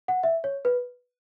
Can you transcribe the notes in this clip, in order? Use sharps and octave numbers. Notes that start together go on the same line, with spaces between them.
F#5
E5
C#5
B4